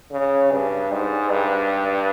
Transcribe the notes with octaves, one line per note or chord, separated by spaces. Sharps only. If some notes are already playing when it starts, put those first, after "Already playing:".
C#3
G2
G#2
G2